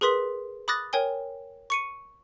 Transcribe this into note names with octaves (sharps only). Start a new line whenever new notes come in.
G#4 A#4 B4 C6 D#6 B6
B5 D6 D#6 F#6 A6 A#6
A#4 C#5 G5 G#5 G7
C#6 C#7 D#7